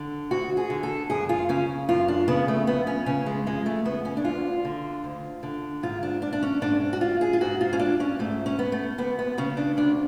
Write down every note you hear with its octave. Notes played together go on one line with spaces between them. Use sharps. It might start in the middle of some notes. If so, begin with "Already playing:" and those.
Already playing: D3
D2 F#4
G#4
D3
A4
F#2 G#4
F4
C#3 C#4
F#2 F4
D4
C#3 B3
A3
F2 B3
C#4
C#3 C#4
G#3
F2 G#3
A3
C#3 B3
C#4
D4
D2 F4
D3
D2
D3
G#2 F4
D4
D4
D4
C#4
G#2 D4
F#4
F4
G#4
F4
G#2 F#4
F4
C#4
D4
C#4
G#2 A3
C#4
B3
A3
D2 B3
B3
C#3 C#4
D4
D2 D4